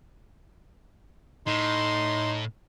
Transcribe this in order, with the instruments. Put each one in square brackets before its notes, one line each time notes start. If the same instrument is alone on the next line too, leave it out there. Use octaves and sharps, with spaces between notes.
[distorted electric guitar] A2 [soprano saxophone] D#4 [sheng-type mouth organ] C6